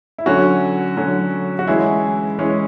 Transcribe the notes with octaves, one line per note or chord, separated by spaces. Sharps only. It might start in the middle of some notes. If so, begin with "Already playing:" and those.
E4
D3 F#3 C#4 F#4
D3 F#3 C#4
F#4
E3 G#3 C#4 E4
E3 G#3 C#4